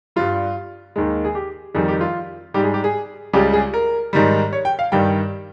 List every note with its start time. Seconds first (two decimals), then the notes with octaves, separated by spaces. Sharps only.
0.16 G2 G3 F4
0.96 D#2 D#3 G#3
1.25 G#4
1.35 G4
1.74 F2 D#3 G3 G#4
1.88 G4
2.01 F4
2.54 G#2 G3 G4
2.64 G#4
2.74 G4
2.84 G#4
3.33 C#2 C#3 G3 G4
3.53 G#4
3.74 A#4
4.13 G#2 D#3 G3
4.53 C#5
4.65 G5
4.79 F5
4.92 G2 D#3 G3 G5